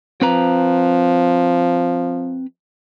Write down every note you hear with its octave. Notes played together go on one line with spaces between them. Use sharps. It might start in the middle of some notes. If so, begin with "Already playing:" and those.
F3 C4 B4 A#5